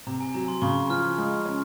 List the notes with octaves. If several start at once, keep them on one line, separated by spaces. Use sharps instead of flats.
C3 A#5
G#5
F#3 A#5
C6
C#3 C#6
F3 F6
G#3
C#4